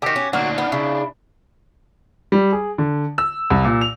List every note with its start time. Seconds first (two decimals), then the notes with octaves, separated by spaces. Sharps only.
0.02 D3 D#3 F#4 G4
0.16 C#4
0.33 D2 A#2 F#3 A#3 D4 D#4 F#4
0.58 B3
0.72 C#3 E4
2.32 G3
2.52 G#4
2.78 D3
3.18 E6
3.50 C2
3.64 A#2
3.81 F7